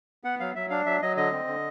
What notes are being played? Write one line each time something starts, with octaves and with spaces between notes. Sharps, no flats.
B3 F#5
F#3 F5
F#3 E5
D4 F5
F#3 E5
F#3 D#5
D3 D#5
C4
D3